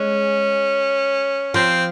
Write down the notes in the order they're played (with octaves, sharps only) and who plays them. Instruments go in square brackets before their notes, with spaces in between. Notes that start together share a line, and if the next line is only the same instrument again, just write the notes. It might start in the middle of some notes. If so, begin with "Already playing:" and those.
Already playing: [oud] G#3 [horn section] C#4
[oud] F3 [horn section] C4